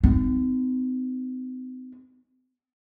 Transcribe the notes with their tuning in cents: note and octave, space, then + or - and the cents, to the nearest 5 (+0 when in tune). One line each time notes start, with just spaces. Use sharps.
C4 -40 D#4 +0